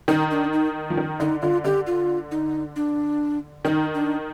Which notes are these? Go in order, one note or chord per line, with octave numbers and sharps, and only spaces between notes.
D#3 D#4
D4
D#4
F3
D#3
D3 D#4
D3 F4
D3 G4
F4
D#4
D4
D#3 D#4
D4